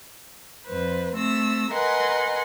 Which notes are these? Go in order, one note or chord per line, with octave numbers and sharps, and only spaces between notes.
F2 B4 C5
A3 C4 E6 A#6
A#4 B4 D#5 F#5 G#5 C6